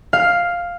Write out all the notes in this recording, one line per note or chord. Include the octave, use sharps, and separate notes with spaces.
F5